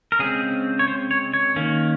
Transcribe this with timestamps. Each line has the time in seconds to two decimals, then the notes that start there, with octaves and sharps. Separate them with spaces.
0.12 A#4
0.19 C#3 G#3 C4 G#4
0.79 C#5
0.88 C5
1.11 C#5
1.34 C#5
1.56 D#3 A#3 C#4